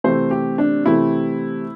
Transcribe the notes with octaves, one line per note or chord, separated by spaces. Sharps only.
C3 E3 A3 C4 C5
G4
D4
C3 E3 A3 C4 E4